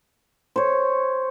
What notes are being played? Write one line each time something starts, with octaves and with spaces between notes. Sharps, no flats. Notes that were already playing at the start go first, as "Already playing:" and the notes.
C5 C#5